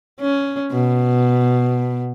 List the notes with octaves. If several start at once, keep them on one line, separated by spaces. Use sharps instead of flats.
C#4
B2